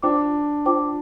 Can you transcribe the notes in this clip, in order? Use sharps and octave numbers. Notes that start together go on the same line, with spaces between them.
D4 F4 C5 G5 D6
F4 C5 G5 D6